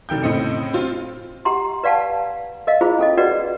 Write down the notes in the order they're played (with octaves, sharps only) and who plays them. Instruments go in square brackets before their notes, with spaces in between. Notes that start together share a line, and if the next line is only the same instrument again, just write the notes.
[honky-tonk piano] F1 D#3 G5 G6
A2 C#3 C4 D#5 C#7
C4 F4
[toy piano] G4 F#5 A#5 C6
B4 D5 F5 F#5 A5
A#4 D#5 F5
E4 F4 G#4 C5
C#4 A4 D#5
F#4 B4 D5 D#5 F#5